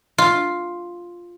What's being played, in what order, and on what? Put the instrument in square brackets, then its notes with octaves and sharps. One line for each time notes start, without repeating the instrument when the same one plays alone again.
[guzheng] F4